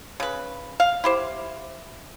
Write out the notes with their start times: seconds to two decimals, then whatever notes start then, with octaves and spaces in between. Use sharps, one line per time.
0.20 C#3 B4
0.80 F5
1.04 E4 G4 C5